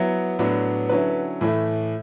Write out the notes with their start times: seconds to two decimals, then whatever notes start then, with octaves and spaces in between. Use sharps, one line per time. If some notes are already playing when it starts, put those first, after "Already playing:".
Already playing: F#3 B3 E4
0.39 A2 F#3 B3 D4
0.89 D3 F#3 C#4 E4 B4
1.41 A2 E3 A3 E4